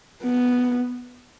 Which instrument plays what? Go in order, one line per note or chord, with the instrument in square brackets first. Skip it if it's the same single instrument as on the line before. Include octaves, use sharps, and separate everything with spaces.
[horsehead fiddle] B3